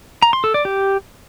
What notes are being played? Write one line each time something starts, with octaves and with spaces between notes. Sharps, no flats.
A#5
C6
A4
D5
G4